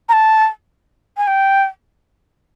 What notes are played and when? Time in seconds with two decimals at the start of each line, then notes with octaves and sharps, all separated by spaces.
0.09 A#5
0.13 A5
1.17 G#5
1.27 G5